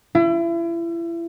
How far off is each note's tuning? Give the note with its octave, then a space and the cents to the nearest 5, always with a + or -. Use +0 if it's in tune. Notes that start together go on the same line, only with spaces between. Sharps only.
E4 +35